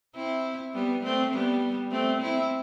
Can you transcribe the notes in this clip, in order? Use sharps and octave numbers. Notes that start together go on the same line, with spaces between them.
C4 E4
G3 B3
A3 C4
G3 B3
A3 C4
C4 E4